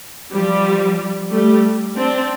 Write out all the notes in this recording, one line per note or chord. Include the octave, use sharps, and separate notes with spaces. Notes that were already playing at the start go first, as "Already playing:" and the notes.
F3 G3
G3 A3
C4 D4